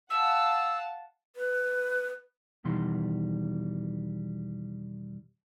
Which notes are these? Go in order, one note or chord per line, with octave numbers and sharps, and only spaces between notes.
F5 F#5 A5 E6
B4
E2 B2 D#3 E3 G3 C6